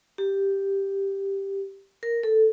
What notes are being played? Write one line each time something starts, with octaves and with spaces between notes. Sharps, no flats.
G4
A#4
A4